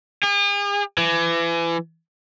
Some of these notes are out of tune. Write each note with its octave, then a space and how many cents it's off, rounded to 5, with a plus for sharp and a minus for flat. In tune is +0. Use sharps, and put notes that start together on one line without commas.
G#4 -45
E3 +30